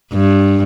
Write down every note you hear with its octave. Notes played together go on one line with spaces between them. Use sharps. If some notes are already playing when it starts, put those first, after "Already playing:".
G2